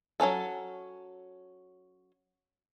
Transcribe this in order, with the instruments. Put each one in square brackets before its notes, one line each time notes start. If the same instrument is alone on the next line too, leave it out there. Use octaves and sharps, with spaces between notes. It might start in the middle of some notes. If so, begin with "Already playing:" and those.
[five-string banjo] F#3 C4 C#4 A4